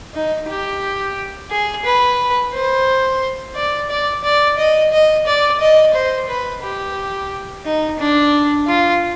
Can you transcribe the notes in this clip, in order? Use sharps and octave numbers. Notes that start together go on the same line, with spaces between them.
D#4
G4
G#4
B4
C5
D5
D5
D5
D#5
D#5
D5
D#5
C5
B4
G4
D#4
D4
F4